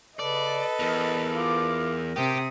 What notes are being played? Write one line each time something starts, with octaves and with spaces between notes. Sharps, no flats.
C#3 A4 B4 D5 D#5
E2 A#4
F4 D6
C3 G4 D#6